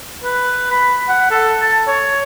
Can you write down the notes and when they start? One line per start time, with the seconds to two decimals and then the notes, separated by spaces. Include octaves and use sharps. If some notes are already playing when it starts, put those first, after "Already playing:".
0.24 B4
0.71 B5
1.09 F#5
1.31 A4
1.61 A5
1.87 C#5